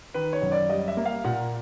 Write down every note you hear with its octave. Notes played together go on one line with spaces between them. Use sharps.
D#3 B4
C#5
F#2
D5
G3 D#5
E5
A#3
F5
A#2 F#5